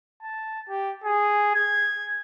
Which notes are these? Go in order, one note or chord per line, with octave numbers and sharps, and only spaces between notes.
A5
G4
G#4
G#6